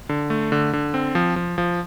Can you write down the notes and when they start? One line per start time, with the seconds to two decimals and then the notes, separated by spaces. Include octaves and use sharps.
0.09 D3
0.30 A3
0.52 D3
0.73 D3
0.94 C4
1.15 F3
1.36 F3
1.58 F3